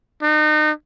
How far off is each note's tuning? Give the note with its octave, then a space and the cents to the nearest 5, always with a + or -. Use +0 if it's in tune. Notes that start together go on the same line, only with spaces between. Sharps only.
D#4 -35